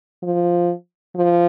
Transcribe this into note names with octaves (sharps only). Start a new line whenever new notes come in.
F3
F3